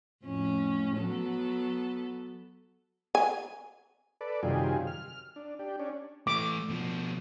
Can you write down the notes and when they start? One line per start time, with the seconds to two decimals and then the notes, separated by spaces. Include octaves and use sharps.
0.24 F2 A2 C#4
0.96 F#3 B3 A4
3.15 G#5
4.21 A4 B4 D5
4.43 F#2 C3 D#3 G3 F4 G#4
4.87 F6
5.36 D4
5.59 D4 G4
5.79 C#4 D4
6.27 E3 A3 D6
6.69 B2 F3